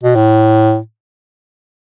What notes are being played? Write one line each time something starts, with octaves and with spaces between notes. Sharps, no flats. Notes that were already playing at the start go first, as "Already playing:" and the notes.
B2
A2